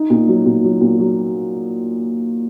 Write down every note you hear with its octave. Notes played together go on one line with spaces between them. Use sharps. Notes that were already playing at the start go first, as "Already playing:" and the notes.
Already playing: D#4
A#2
F#3
A#2
F#3
A#2
F#3